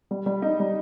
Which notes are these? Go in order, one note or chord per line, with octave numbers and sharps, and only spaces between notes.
G3
G3
D#4
G3